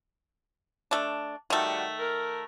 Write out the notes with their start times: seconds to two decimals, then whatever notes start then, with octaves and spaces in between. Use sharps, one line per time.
0.91 A3 D4
1.50 D#3 G3 A3 F#4
1.99 A#4